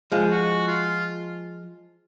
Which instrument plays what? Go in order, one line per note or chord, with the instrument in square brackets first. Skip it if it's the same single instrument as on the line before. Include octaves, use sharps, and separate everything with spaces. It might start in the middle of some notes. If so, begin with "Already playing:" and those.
[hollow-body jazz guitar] F3 G#3
[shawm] F#4
F4